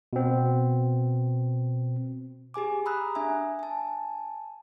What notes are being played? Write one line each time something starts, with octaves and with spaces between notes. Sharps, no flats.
B2 C4
G4 G#4 G#5 D6
A#5 B5 D#6 E6 F#6
D4 E5 G#5
G#5 A5